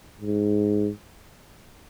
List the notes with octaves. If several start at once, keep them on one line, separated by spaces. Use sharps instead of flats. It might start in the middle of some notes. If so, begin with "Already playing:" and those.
G#2